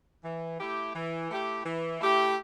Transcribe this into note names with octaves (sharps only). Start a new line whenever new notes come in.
E3
A3 E4 G4
E3
A3 E4 G4
E3
A3 E4 G4